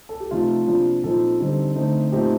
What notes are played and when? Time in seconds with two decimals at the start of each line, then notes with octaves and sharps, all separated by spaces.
0.09 A4
0.20 G4
0.31 C3 F3 A3 D#4 F4
0.67 C3 F3 A#3 D4
1.04 A#2 F3 C4 D#4 A4
1.40 D3 G3 C4 D#4
1.76 D3 A3 C4 D#4
2.12 A#2 A3 C4 D#4 G4